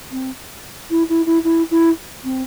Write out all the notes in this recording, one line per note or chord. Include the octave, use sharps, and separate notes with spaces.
C4
E4
E4
E4
E4
E4
C4